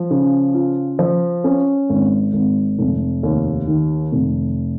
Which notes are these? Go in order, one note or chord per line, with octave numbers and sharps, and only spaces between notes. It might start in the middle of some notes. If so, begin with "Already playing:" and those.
Already playing: F3
C#3
F4
F3
C#4
G#1
G#1
F1
D#2
D#3
F1